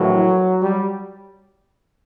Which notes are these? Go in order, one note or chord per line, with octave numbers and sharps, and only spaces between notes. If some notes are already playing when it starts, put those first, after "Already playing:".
Already playing: A#1 A2 E3 F#3
G3